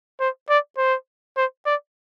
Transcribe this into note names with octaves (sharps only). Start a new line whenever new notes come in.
C5
D5
C5
C5
D5